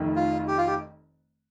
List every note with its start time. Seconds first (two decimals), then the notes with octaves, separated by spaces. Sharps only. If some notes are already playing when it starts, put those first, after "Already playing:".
Already playing: F1 F2 D#3 A3
0.16 F4
0.48 G4
0.58 F4
0.67 G4